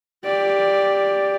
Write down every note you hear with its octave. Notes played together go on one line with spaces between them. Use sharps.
G4 D5